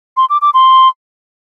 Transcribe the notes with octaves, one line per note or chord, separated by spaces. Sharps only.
C6
D6
D6
C6